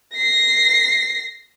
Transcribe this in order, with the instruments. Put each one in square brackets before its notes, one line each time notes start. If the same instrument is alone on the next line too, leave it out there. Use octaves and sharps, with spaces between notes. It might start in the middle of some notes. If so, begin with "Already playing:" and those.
[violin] A#6 C7